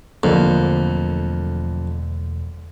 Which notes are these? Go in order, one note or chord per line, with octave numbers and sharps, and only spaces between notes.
E1 F2 D3 F#3 A3 A#3